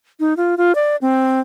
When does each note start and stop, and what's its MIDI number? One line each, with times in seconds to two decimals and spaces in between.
0.20 0.34 63
0.37 0.55 65
0.58 0.75 65
0.75 0.96 74
1.01 1.41 60